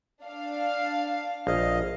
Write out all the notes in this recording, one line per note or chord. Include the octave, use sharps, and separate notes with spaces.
D4 F5
A#1 D#5 F5